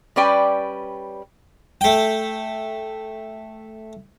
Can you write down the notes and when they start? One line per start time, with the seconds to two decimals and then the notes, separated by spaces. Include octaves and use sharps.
0.16 G3 C#4 B4 D5 G5
1.81 A3 G5